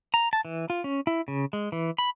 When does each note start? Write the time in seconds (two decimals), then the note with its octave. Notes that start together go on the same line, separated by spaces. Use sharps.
0.14 A#5
0.33 A5
0.45 E3
0.70 F4
0.84 C#4
1.07 E4
1.28 C#3
1.53 G#3
1.72 E3
1.98 B5